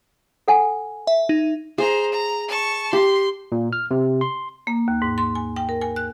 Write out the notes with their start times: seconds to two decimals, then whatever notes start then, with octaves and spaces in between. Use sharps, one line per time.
0.48 A4 F#5 G#5
1.07 E5
1.29 D#4
1.78 G#4 C5 A#5
2.12 A#5
2.48 A5 C#6
2.93 G4 C6
3.52 A#2
3.73 F6
3.91 C3
4.21 C6
4.67 A#3
4.88 D#2
5.02 G#2
5.18 C6
5.35 G#5
5.56 G5
5.69 A#4
5.81 G#5
5.96 F#6